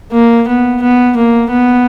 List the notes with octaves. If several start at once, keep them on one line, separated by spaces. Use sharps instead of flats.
A#3
B3
B3
A#3
B3